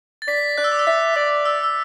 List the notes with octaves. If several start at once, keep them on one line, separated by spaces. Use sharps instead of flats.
A6
D5 B6
D5 F#6
E6
D6
E6
E5 D6
D5 D6
E6
E6